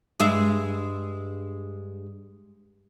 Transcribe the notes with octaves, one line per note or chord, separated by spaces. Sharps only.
G2 G#3 E5